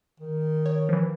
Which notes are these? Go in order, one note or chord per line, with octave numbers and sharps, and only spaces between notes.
D#3
C#5
E3 F3